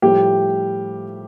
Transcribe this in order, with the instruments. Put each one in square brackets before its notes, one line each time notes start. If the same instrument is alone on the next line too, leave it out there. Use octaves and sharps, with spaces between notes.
[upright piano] A2 F3 G3 A3 G4